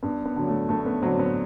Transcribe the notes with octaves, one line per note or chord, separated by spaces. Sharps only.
G2 B3
B3
D3 F#3
A3
G2 A3
B3
D3 F#3 C4
B3